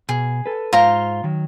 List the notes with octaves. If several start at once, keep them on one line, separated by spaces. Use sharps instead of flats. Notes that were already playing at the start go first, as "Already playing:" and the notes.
B2 G#4
A4 B4
G#2 F4 C5 F5 A#5
D#3 F#3